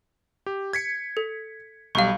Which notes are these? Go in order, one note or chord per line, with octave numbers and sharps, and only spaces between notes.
G4
G#6 B6 C#7
A4
B1 G3 F5 C#6